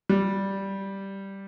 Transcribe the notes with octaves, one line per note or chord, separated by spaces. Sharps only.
G3